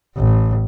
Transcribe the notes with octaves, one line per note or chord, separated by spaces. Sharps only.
A1